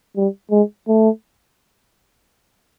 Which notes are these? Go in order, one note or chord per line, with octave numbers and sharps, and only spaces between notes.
G3
G#3
A3